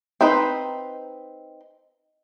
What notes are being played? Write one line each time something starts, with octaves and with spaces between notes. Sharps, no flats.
C4 D#4 B4 C5